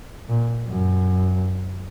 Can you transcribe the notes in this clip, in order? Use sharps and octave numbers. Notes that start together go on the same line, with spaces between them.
A#2
F#2